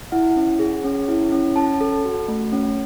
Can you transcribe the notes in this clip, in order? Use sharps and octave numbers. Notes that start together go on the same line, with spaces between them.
E4 F#5
C#4
G#4
C#4
E4
C#4
C#4 A5
A4
F#4
A3
C#4